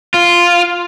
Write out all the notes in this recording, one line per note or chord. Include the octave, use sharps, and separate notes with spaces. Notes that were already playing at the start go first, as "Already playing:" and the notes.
F4